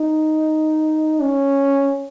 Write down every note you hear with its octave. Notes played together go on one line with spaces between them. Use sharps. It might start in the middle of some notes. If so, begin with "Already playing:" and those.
Already playing: D#4
C#4